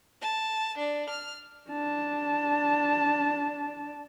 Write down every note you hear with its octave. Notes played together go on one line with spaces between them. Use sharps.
A5
D4
F6
D4 A5